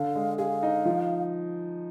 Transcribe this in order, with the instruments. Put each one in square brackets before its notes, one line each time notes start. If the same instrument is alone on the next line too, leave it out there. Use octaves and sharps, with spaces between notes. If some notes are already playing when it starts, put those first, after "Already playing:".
Already playing: [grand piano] D3 [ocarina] F5
[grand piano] G#3
[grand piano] G#4 [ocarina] F5
[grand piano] D#4
F3